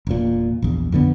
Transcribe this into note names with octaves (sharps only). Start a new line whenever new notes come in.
E1 A#2
A#1 E2
F2 D3 B3